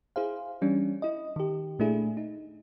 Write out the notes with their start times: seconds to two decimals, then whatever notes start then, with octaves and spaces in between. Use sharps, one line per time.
0.16 E4 G#4 C5 F5
0.62 E3 G3 C#4 D4
1.02 E4 D#5
1.36 D#3 G4
1.79 A#2 A3 D4 E4 G#4
2.17 D#4